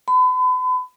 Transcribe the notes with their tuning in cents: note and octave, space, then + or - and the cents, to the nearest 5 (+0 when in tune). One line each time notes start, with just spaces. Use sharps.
B5 +40